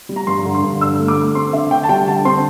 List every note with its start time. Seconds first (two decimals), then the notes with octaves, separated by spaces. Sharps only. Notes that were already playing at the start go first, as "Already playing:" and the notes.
0.09 G3
0.16 A#5
0.27 G2 C6
0.45 D3
0.54 C6
0.63 G2
0.81 D3 E6
0.99 A3
1.08 D6
1.17 A3
1.35 C4 C6
1.53 D3 E5
1.71 D3 G5
1.83 A5
1.89 G3 G5
2.07 D3 A5
2.25 C4 C6